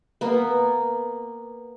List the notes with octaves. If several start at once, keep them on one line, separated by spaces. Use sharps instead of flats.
A#3 B3